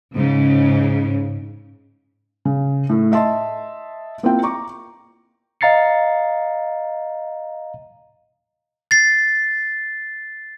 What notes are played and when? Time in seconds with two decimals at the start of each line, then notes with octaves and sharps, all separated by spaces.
0.14 G#2 C#3
2.45 C#3
2.89 A2 A3
3.12 D#5 E5 A5 C6
4.23 A#3 C4 E4 F4 G5
4.43 A#5 C#6 D6
5.61 D#5 F5 A#5 A6 C7 C#7
8.91 A6 C7